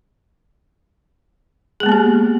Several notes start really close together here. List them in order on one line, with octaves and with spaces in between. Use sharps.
G#4 G#3 B3 A#3 G4